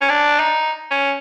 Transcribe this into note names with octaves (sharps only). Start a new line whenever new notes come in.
C#4
D4
D#4
C#4